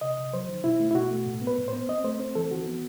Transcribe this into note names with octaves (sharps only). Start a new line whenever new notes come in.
C3 D#5
C3
F#3 C5
D#3
B2 E4
A3
E4
B2 F#4
A3
A2
B3
B4
A2
C5
B3
C4 D#5
A3 C5
C4 C5
E3 A4
D#3 F#4
B3